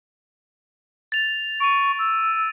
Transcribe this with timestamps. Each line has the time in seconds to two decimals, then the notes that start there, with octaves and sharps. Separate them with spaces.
1.12 A6 F7
1.60 C#6 D7 D#7
1.99 E6